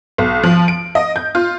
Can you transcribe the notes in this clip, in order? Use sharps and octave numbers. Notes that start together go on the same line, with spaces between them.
B1
F3
D7
D#5
G6
F4